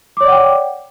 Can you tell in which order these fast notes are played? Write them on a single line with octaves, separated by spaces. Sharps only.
D6 C#5 D5 F#5 G5